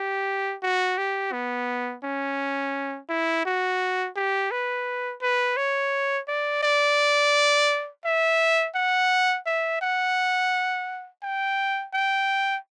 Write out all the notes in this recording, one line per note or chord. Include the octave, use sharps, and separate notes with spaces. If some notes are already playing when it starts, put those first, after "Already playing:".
Already playing: G4
F#4
G4
B3
C#4
E4
F#4
G4
B4
B4
C#5
D5
D5
E5
F#5
E5
F#5
G5
G5